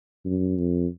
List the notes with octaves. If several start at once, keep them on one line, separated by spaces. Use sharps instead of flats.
F#2
F2